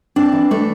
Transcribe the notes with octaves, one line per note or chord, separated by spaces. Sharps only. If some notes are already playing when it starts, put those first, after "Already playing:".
C4 D4
E3
A3 D4